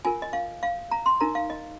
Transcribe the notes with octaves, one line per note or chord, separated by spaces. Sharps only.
F4 A#4 G#5
D#5
F5
F5
A#5
C6
D#4 A#4 A#5
F5
D#5